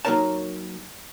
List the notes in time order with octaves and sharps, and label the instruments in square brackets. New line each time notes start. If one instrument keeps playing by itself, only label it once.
[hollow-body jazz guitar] F#3 A#3 D#4 A#4 C#5 A5